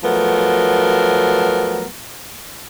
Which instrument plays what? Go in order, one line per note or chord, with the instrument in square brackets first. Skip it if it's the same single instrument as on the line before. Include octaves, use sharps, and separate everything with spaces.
[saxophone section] F3 F#3 A3 B3 A#4